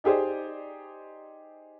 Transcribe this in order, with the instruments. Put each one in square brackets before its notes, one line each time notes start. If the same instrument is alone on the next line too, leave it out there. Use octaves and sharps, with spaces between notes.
[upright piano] D#4 G4 G#4 C5 D5